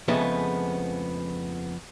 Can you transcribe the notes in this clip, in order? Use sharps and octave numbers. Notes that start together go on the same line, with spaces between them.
F2 C#3 F3 G#3 A3 B3